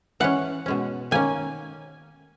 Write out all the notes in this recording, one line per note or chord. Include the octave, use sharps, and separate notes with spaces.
E3 G#3 C#4 F#5
B2 G#3 C#4
D#3 A#3 C#4 G#5